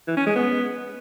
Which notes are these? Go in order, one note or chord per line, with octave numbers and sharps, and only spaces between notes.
E3
C#4
G#3
B3